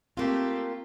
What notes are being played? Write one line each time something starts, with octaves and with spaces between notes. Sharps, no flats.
A3 A#3 C4 F4 G4